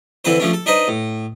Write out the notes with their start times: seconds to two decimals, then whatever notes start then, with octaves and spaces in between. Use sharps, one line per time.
0.25 D3 E3 C4 B4 C5
0.39 F3 A3 C#4 D4
0.53 A4
0.66 D4 D#4 B4 C5 D#5
0.88 A2